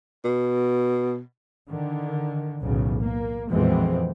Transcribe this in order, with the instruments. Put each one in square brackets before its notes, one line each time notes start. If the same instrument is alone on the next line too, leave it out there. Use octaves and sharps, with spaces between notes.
[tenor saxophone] B2
[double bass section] D3 D#3
B1 E2 A2 C#3
A#3
A#1 F2 B2 E3 G#3 C4